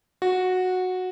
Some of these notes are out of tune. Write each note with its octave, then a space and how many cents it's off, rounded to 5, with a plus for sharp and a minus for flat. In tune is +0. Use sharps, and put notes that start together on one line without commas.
F#4 -10